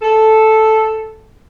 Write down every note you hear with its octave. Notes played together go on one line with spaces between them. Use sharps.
A4